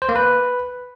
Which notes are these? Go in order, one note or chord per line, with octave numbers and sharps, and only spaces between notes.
C5
A#3
B4